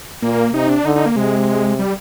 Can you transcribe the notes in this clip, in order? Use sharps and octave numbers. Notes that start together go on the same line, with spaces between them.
A#2 A#3
C3 D#4
D4
D3 D#4
D#4
A#3
C3 G#3
G3